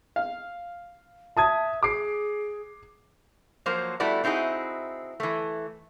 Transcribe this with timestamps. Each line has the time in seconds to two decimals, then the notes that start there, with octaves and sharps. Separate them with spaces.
0.16 F5
1.37 E5 A5 D#6 G#6
1.83 G#4 D6 C7
3.66 F3 F#3 A#3 C5
4.00 G3 A3 B3 E4 F#4 D5
4.24 C4 D#4 E4 F#4 G#4
5.20 E3 A3